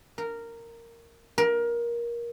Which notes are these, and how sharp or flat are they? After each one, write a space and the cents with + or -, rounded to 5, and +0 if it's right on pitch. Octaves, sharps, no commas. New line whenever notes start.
A#4 -10
A#4 +20